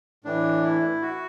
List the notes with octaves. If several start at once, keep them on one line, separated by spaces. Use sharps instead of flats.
A2 E3 D4
E4
F#4